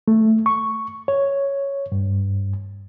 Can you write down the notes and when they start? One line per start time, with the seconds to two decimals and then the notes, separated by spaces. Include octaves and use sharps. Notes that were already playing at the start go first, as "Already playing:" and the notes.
0.08 A3
0.46 C#6
1.08 C#5
1.92 G2